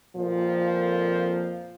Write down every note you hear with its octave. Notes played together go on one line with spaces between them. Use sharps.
F2 A#2 F3